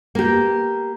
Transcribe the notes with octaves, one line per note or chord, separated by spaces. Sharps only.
A#3 G4